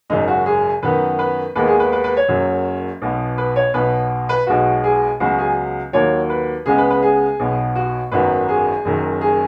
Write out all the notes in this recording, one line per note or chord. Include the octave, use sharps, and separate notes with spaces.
G#1 F#2 C#3 D#4
F#4
G#4
F#2 D#3 B3 B4
B4
D#2 D#3 G#3 B3 B4
G#4
B4
B4
B4
C#5
F#1 F#2 F#3
B1 B2 B3
B4
C#5
B1 B2 B3 B4
B4
B1 B2 G#3 B3 F#4
G#4
C#2 C#3 F#3 B3 F#4
G#4
D#2 D#3 F#3 C#5
B4
C#2 C#3 G#3 B3 G#4
B4
B4
G#4
B1 B2 B3
F#4
G#1 F#2 D#3 F#3 B3 B4
G#4
F#1 F#2 D#3
G#4